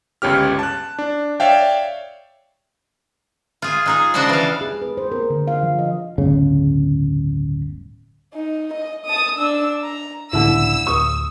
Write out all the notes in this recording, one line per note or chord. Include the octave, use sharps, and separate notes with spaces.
G1 C#2 C#4 G4 F6
A5 F#6
D4
C#5 D5 E5 F5 G5
F4 G#4
G#3 D#4 G#4
C#3 F3 D4 F#4 C5 D5
E3 F5
G#4
B4
C5
A#4
D3
F5
F3
D#5
D1 G1 C#3
D#4
D#5
A5 D#6
D4 E6
A#5
G1 C#2 A2 D3 E4 E6
D1 C#6 D#6